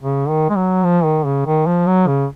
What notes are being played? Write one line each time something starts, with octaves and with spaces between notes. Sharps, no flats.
C#3
D#3
G#3
F#3
F3
D#3
C#3
D#3
F3
F#3
C#3